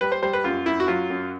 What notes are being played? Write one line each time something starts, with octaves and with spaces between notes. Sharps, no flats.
G3 B4
C5
G3 C5
B4
F#2 F4
F#2 E4
F#4
F#3 F4
F#2